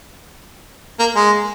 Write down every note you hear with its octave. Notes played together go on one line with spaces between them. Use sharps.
A#3
G#3